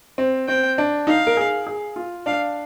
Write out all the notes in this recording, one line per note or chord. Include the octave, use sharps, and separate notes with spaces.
C4
C4 G5
D4
D#4 F5
A#4
G#4
G#4
F4
D4 F5